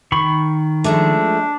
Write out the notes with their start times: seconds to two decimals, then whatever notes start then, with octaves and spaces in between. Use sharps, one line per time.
0.12 D#3 B5 C#6
0.84 F3 G#3 A3 D4